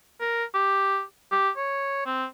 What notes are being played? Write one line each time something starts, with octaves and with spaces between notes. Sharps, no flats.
A#4
G4
G4
C#5
C4